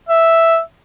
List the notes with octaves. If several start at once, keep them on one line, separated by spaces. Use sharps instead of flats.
E5